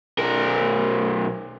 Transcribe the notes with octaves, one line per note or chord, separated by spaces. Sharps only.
B1 A#4